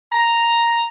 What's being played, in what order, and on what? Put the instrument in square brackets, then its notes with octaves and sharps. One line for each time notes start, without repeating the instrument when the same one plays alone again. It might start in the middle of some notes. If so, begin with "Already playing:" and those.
[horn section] A#5